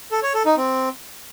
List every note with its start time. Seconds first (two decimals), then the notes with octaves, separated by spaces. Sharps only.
0.12 A4
0.23 C#5
0.34 A4
0.46 D#4
0.57 C4